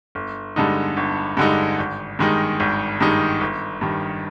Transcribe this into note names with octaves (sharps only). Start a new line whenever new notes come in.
G1
G2 D3 G#3 D#4
G1
G2 D3 G#3 D#4
G#1
G2 D#3 G#3 D#4
G#1
G2 D#3 G#3 D#4
G1
G2 D#3